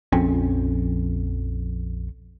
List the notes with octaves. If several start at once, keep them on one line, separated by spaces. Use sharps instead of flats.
A#1 F2 C4 C#4